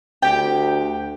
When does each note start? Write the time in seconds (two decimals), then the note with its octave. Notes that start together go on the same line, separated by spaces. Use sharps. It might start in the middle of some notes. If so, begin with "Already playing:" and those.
0.22 D2 G4 G5